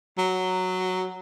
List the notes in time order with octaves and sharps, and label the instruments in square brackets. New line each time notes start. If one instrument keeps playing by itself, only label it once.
[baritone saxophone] F#3